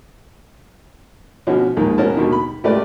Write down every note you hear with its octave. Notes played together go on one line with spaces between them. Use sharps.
B2 D3 F3 C#4 D#4 F#4
A#1 D#2 G#2 D#3
B2 C#4 F#4 A#4 A5
D#2 B2 D3 D#3
B5
C#2 A3 A#3 G4 B4 D5